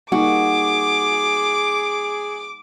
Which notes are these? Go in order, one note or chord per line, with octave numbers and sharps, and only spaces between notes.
G3 A#3 D#4 F#4 G#4 D6